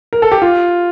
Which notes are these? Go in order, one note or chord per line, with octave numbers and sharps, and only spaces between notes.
A#4
A4
G4
F4